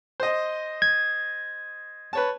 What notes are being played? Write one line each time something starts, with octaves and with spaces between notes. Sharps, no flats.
C5 D#5
G#6
B4 C#5 A5